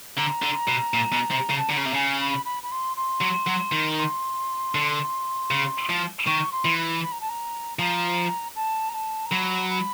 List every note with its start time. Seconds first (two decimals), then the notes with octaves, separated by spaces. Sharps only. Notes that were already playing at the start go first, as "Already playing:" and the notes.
0.17 D3 A#5
0.42 D3
0.68 B2
0.94 A#2
1.12 B2
1.31 C3
1.50 C#3
1.57 A5
1.69 D3 A#5
1.78 C#3
1.86 C3
1.94 C#3 G#5
2.20 B5
2.45 B5
2.63 B5
2.71 C6
2.96 C6
3.21 F#3
3.47 F#3
3.72 D#3
3.98 C6
4.75 D3
5.51 C#3
5.89 F3
6.26 D#3 C#6
6.52 C6
6.65 E3
6.78 B5
7.03 B5
7.12 A#5
7.21 A5
7.29 A#5
7.79 F3 A#5
8.56 A5
8.89 A#5
8.94 A5
9.25 A#5
9.32 F#3 B5
9.70 B5